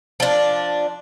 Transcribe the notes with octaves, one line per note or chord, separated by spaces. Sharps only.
F3 D4